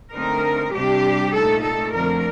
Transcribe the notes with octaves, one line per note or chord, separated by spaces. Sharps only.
D3 A3 C4 D#4 A#4
C3 G3 D4 G4
A#2 A3 D#4 A4
A4
F2 D3 F3 A3 C4 A#4